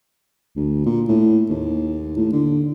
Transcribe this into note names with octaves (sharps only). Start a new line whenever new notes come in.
D2
A#2
A2
D#2
A2
D3